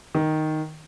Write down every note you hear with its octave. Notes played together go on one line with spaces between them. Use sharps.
D#3